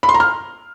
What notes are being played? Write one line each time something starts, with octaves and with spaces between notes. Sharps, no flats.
B5
C6
A#5
F6